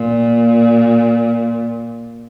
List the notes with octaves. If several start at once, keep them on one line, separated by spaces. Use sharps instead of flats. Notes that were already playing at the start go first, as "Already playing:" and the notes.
Already playing: A#2